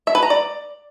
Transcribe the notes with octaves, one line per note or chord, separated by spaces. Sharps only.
E5
B4
A#5
D5